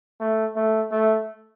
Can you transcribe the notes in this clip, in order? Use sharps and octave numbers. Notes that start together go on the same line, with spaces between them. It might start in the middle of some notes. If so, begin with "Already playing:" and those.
A3
A3
A3